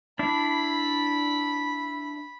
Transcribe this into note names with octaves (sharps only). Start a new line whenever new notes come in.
D4 E4 B5